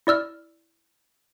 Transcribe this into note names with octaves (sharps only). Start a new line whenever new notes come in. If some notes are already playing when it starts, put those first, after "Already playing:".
E4 D5 E6 F6